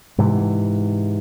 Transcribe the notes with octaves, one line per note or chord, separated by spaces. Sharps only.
G#2 C3 E3